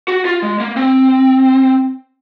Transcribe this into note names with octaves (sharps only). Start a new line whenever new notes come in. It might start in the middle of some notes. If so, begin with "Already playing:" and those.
F#4
F4
G#3
A#3
C4